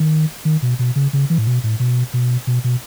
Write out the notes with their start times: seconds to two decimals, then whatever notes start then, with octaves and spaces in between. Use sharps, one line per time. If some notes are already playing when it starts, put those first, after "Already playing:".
Already playing: D#3
0.45 D#3
0.62 B2
0.79 B2
0.96 C#3
1.13 C#3
1.30 E3
1.38 A2
1.47 B2
1.64 A2
1.80 B2
2.14 B2
2.47 B2
2.64 B2